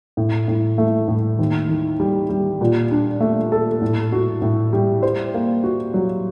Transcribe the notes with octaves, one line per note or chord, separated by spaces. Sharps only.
A2
A2
A3
A2
D#2
D#3
G3
G3
A#2
D4
A3
A4
A2
F#4
A2
G3
C5
A#3
F#4
F#3